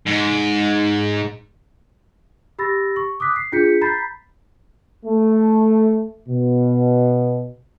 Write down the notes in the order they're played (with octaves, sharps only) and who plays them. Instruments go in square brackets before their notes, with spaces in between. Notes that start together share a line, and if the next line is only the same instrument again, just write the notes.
[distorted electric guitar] G#2
[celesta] G4 B5 E6 A6 A#6
C#6
D6 D#6 F#6 B6
C7
D4 F4 G#4 G6 B6 C#7
A#5 B5 G6 A6 B6 C7
[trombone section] A3
B2